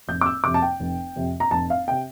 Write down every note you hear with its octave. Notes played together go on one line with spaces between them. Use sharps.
F1 G6
D6
E6
F2 C3 D6
A5
G5
F1
F2 C3
A#5
F1 A5
F5
C3 G5